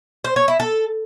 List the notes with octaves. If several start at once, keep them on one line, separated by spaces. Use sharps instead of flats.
C5
C#5
E4
A4